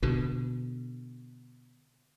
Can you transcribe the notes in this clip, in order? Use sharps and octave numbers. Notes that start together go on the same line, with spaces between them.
B2 D3